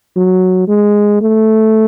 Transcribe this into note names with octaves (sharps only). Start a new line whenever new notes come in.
F#3
G#3
A3